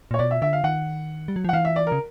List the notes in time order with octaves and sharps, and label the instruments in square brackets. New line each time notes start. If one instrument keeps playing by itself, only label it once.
[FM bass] A#2 [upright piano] C#5
[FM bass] B2 [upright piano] D5
[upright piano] E5
[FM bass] D3 [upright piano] E5
[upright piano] F5
[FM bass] D#3 [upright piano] F#5
[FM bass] G3
F#3
F3
[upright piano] F#5
[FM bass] E3 [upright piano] F5
[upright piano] E5
D5
A#4
[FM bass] C#3